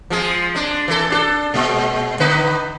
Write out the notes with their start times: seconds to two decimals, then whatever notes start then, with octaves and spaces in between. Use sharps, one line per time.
0.10 F3 G#3 G#4
0.55 G#3 D4
0.88 E3 A4
1.10 D4 G4 A4
1.54 A#2 G#3
2.20 D3 D#4 B4